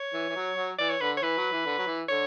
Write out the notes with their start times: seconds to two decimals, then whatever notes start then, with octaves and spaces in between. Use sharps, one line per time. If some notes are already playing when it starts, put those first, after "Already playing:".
Already playing: C#5
0.14 E3
0.29 E3
0.36 F#3
0.57 F#3
0.78 E3 D5
0.90 C#5
1.00 D3 B4
1.17 C#5
1.22 E3 B4
1.37 F#3
1.52 E3
1.66 D3
1.78 F#3
1.87 E3
2.08 D3 C#5